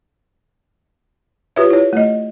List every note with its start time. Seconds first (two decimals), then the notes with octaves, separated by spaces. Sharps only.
1.56 F4 G4 B4 C#5 E5
1.70 E4 C#5
1.93 A3 D#5